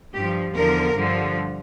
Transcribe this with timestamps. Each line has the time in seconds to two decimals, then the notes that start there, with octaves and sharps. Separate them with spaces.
0.14 G2 F3 G4
0.55 E2 D3 F3 A#4
0.96 G2 D3 F3